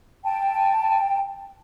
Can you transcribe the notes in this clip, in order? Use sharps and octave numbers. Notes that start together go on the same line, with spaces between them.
G5 A5